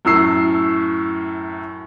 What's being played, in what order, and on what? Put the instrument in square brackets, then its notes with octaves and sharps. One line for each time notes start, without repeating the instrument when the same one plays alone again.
[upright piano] F#2 A2 E6 C7